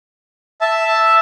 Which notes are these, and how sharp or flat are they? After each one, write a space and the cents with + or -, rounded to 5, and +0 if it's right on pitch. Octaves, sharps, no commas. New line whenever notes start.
E5 +0 A5 +0